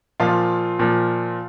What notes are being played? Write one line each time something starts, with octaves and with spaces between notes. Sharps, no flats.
A#2 F3 F4 F5
A#2 F3